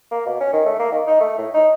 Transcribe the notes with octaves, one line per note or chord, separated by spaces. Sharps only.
A#3
B2
C#4
D#3
A3
A#3
D#3
D#4
A3
A2
D#4